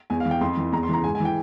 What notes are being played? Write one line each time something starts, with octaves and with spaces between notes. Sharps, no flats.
E2 G#5
F5
E3
G5
F2 C6
E3
E2 A#5
C6
C#3 E3 A#5
G#2 G#5
G#5
E3
G5